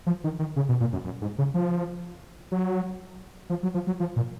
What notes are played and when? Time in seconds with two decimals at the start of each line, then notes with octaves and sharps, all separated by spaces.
0.06 F3
0.24 D#3
0.39 D#3
0.56 C#3
0.69 B2
0.80 A#2
0.93 F#2
1.05 F#2
1.22 G#2
1.38 C#3
1.54 F3
2.52 F#3
3.50 F3
3.63 F#3
3.74 F3
3.87 F#3
4.00 F3
4.16 A#2